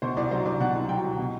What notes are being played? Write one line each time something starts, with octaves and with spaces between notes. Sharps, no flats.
B2 C5
C2 D5
F#3 C5
C2 D5
B2 F#5
C2
F#3 G5
C2
B2